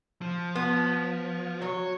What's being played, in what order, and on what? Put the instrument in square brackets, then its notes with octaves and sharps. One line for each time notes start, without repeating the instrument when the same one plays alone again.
[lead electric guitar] F3
[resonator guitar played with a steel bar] B3
[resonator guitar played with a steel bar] F#3 [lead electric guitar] C#5